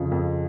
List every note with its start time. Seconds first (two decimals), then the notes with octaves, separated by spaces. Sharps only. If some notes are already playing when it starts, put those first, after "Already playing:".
Already playing: F2 C#3 F3
0.11 F2